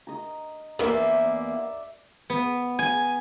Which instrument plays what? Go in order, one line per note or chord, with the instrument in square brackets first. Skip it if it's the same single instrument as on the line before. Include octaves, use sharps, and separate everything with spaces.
[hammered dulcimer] D#5 A#5
[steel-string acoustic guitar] E2 A#3 [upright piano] A#4 [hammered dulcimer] D5 E5
[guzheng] B3
G#5